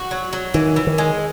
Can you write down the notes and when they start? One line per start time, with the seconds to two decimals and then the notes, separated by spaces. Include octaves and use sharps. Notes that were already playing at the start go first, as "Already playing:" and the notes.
Already playing: F#4
0.11 F#3
0.33 F#3
0.54 D#3 E3
0.76 E3
0.87 D#3
0.98 G#3